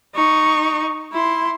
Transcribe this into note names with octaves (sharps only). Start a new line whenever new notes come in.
D#4 C#6
E4 C6